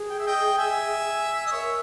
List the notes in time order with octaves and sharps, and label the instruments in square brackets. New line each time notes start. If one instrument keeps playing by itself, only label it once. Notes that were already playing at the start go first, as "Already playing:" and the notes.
Already playing: [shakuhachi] G#4
[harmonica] G5
E5
D#5 G5
E5 G#5
D#5
[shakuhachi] A#4 [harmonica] C#5 E5